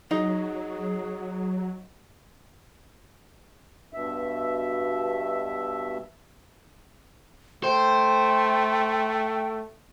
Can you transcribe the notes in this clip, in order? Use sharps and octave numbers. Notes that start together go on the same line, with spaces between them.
F#3 D#4 G#4
G2 B2 E5
A3 C5 G5